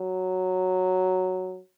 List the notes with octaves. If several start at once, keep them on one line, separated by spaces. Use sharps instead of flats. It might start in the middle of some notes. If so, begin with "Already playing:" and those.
Already playing: F#3